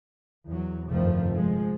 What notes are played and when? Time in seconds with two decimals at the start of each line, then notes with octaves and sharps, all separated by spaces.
0.47 E2 F#3
0.90 F1 D2 G2 D#3 F3 A3
1.34 F3 G#3